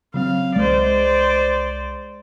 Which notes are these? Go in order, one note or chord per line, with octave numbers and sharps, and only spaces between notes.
C#3 F#3 C4 F5
C2 G#3 C5 D5